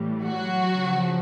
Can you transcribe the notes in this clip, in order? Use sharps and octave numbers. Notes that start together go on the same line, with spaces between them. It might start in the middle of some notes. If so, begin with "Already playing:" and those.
Already playing: A2 E3 G3
F#3 F#4
C#3 F3